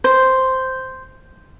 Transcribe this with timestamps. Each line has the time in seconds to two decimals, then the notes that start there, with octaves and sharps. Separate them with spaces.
0.04 C5